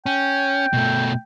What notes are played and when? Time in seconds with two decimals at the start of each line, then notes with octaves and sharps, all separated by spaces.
0.06 C#4 G5
0.73 B2 A3